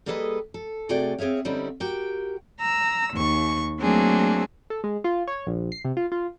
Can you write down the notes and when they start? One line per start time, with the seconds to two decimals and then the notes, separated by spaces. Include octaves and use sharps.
0.06 G3 A#3 G#4 A4 B4 D#5
0.54 A4
0.89 C3 A3 F#4 G#4 D5 G5
1.18 C4 G#4 C#5 E5 F5
1.45 D3 G3 C4 C#4 D#4 E4
1.80 F#4 G4 A#4 G5
2.60 A#5 E6
3.13 D#2 C#6
3.80 F#3 A3 A#3 C4 D4 G#4
4.70 A4
4.84 G#3
5.04 F4
5.27 C#5
5.47 A#1
5.72 C7
5.85 C3
5.97 F4
6.12 F4